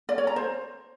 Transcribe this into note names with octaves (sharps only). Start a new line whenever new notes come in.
D5
C#5
A#5
C5